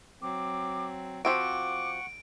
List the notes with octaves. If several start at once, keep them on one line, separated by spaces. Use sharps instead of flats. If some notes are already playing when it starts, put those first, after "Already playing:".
F#3 C4 D6
F3 C4 F#4 F#5 C#6 D6 D7